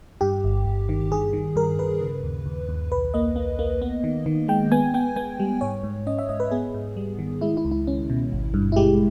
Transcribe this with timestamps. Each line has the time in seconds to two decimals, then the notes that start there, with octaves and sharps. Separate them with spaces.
0.21 G2 G4
0.44 G1
0.66 G1
0.89 D#3
1.11 G2 G#4
1.33 D#3
1.56 G2 A#4
1.79 G2 B4
2.01 C#3
2.24 D#2
2.46 D#2
2.69 D#2
2.92 B1 B4
3.14 A#3 D#5
3.36 A#3
3.59 A#3
3.82 B3
4.04 D#3
4.26 D#3
4.48 G#3 G5
4.72 B3 G#5
4.94 B3 G5
5.16 B3 G#5
5.40 G3
5.61 G#2 C#5
5.84 G#2
6.07 C#4 D#5
6.18 E5
6.29 G#2 D#5
6.40 B4
6.51 B3 G#4
6.74 G#2
6.97 G3
7.19 D#3
7.41 G#3 E4
7.57 E4
7.65 C#2
7.71 E4
7.87 C#4
8.10 B2
8.32 G#1
8.54 G2
8.72 E4
8.76 G#3 G4